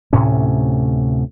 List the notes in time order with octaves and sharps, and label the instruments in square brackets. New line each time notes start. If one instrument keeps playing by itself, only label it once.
[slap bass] D2 A2 C3 C#4